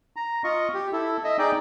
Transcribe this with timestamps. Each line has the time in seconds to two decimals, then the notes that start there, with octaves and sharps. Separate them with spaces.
0.16 A#5
0.44 F4 D#5 C#6
0.74 G4
0.93 E4 A4
1.24 D#5 E5
1.39 D#4 G#4 D5 G5